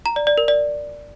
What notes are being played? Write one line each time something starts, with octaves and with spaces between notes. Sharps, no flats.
A#5
D5
D5
A#4
D5